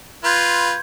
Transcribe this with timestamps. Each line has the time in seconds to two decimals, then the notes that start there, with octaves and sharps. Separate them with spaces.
0.24 F4 B4 C6 G6 G#6